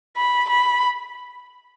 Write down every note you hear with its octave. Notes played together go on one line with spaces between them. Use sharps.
B5
B5